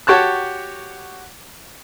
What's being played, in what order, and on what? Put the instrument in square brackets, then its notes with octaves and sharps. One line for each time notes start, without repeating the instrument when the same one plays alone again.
[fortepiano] F#4 G4 C#5 A5 F#6